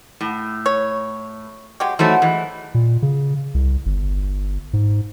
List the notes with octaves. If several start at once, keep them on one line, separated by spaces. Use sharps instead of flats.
A2
C#5
F#3 G#3 G4
E3 F#3 A3 D#4 A4 C5
E3 G#3
A#2
C#3
C2
G1
G#2